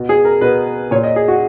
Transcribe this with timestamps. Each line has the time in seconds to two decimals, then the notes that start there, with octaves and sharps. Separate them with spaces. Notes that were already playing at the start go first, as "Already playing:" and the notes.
Already playing: B2
0.09 G#4
0.25 A#4
0.41 B2 B4
0.91 A#2 C#5
1.04 D#5
1.16 G#4
1.28 F#4